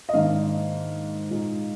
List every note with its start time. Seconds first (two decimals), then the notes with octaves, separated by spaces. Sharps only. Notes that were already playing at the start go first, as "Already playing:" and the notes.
0.09 D#5
0.13 G#2 D#3 A#3 D4 F5
1.30 A#2 G#3 D#4